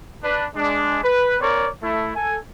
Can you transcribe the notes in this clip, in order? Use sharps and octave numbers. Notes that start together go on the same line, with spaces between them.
D4 B4
G#3 D4
B4
C4 A#4 C#5 D5
A3 E4
A4 G#5